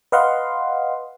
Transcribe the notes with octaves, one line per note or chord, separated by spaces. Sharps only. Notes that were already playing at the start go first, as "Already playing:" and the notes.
B4 D#5 F5 F#5 C6